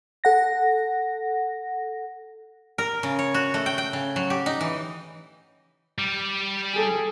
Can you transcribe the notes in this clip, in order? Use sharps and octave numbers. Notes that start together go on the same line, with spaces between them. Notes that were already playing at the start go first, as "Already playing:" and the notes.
A4 F#5 A#6
A#4
C#3
C#5
F#4
A3
G5
G5
C#3
F#3
G4
D#4
E3
G3
G#4 A4